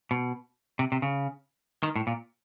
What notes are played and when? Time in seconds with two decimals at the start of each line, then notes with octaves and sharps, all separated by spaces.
0.11 B2
0.79 C3
0.92 C3
1.02 C#3
1.83 D#3
1.96 A2
2.07 A#2